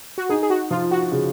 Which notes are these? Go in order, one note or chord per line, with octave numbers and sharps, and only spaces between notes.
F#4
D#4 G#4
G#4
F#4
F3 F4
F#4
C#3